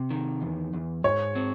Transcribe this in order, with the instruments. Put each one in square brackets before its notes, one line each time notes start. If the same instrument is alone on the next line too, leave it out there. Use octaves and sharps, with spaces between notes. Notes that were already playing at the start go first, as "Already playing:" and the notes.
Already playing: [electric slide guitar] C3
D#3
E2
E2
[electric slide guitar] G#2 [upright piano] C#5
[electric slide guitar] C4